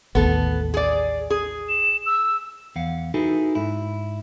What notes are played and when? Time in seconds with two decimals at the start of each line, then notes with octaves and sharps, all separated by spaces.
0.15 A1 D#2 A2 B3 A4
0.74 G#4 D5
1.30 G#4
1.69 E7
2.06 E6
2.76 E2 F5 F#5
3.14 D#4 E4 F#4 G#4 A4 B4
3.55 G#2 E4